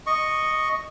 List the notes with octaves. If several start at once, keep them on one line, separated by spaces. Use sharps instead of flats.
D#5 C#6